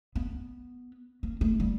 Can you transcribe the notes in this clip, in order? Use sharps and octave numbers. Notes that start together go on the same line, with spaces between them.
B3
A#3
A3
G3